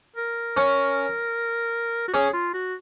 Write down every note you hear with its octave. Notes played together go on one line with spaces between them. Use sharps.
A#4
C#4
F#4
C#4 G#4
F4
F#4